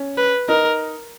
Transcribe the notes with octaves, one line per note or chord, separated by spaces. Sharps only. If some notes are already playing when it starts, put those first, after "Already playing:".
Already playing: C#4
B4
D#4 A#4